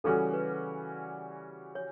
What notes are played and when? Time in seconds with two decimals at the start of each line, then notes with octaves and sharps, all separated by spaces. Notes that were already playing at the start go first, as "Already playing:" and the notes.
0.04 C#3 E3 G3 C#4 F#4 A4
0.33 B4
1.75 C#5